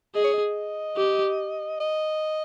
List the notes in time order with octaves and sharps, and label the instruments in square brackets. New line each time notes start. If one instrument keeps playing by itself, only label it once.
[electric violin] G#4 [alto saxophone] D#5
[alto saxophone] C#5
D#5
[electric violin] G4
[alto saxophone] D#5